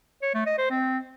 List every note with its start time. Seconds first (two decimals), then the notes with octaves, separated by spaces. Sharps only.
0.22 C#5
0.34 A3
0.46 D#5
0.58 C5
0.70 C4